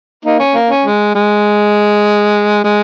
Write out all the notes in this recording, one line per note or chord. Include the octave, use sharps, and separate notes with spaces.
A#3 D#4
C#4
A#3
C#4
G#3
G#3
G#3